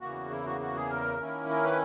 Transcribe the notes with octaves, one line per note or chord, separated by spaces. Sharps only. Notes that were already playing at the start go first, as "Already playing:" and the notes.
E2 C#3 E3 A#3 F#4
E4
F#4
F#4
G#4
A#4
D#3 A#3 C#4 E4
A#4
B4